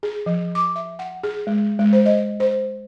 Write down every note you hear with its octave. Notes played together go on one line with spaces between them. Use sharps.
G#4
F3
D6
E5
F#5
G#4
G#3
G#3
C5
D#5
C5